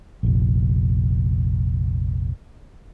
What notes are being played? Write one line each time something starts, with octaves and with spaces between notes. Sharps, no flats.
F1 A#1